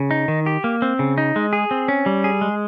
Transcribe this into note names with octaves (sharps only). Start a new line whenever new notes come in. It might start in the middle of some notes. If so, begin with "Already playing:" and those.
Already playing: C#3
D#4
D#3
G4
A#3
C4
C#3
D#4
G#3
G#4
C4
C#4
G3
G#4
G#3